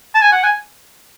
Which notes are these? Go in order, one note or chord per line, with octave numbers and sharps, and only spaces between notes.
A5
G#5
F#5
G#5